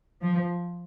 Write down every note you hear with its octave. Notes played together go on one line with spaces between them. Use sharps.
F3